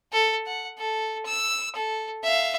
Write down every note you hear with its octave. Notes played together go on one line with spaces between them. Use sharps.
A4
F#5
A4
E6
A4
E5 F5